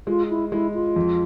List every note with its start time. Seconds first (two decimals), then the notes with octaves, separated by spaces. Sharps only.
0.07 G#3 F4
0.30 E4
0.52 G#3 E4
0.74 F4
0.96 F2